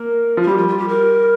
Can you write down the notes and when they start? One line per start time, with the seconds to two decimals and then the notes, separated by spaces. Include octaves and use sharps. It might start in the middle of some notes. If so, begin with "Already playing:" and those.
Already playing: A#3 A#4
0.37 F3
0.42 A#4
0.47 G3 G4
0.57 F4
0.68 F4
0.78 G4
0.88 A#4